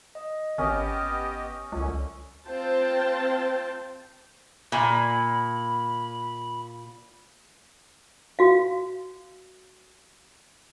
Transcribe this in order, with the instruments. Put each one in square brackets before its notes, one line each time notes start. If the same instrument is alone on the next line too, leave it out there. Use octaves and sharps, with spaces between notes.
[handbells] D#5
[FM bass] G#1 [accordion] B3 G4 D#5 [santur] C#4 [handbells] D#6 F6
[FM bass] C#2 [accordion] F#2 D3 C#4
[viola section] C4 F4 C5 G5 A5
[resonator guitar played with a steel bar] A#2 [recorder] B5
[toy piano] F#4 F5